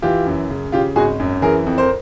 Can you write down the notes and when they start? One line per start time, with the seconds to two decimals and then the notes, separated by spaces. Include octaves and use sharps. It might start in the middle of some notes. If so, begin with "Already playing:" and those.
0.02 E3 F4 G4
0.26 F#2
0.50 C#3
0.72 C#3 F4 G4
0.96 G#1 F#4 G#4
1.20 F#2
1.42 E3 G#4 A#4
1.67 F2
1.78 A#4 C5